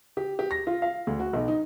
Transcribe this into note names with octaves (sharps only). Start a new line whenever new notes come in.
G4
G4
A#6
F4
F5
D2
F#4
B1
D#4